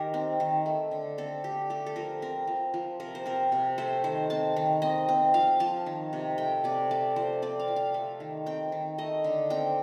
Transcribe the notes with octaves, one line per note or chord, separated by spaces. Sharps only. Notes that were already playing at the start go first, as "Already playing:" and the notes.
Already playing: D#3 G4 A#4
C4
D#3
A3
D3
C4 A4
D3 G4
A3 G4
A4
F3 A#4
C4 A#4
F3
F3
C3 A#4
C5
C4 A#4
C3
A3 C5
D#3 C5
C4 A5
D#3
C4 D#5
C4
F3 F5
F3 A5
D#3
C3
A3 G5
C3 D5
A3 D5
F3 C5
C4 D5
F5
F3
F5
A3
D#3
C4 G5
D#3
A3 D#5
D3
C4 G5